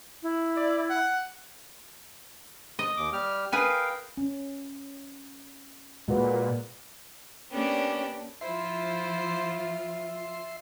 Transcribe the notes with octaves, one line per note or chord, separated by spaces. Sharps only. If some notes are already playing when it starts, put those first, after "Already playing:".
E4
D5
F#5
D#5
D#2 D6
G3 G4 F6
G#4 A#4 B4 F5 G5 G#5
C#4
A#2 G#3 F#4 B4
A#3 B3 C#4 D4 G4
F3 E4 F4 C5 E5 C6